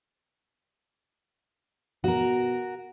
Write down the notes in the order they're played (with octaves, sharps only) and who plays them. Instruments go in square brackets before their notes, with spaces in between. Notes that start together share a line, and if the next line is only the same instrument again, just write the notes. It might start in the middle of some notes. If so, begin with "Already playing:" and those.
[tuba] B2 [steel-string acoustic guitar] F#4 A#4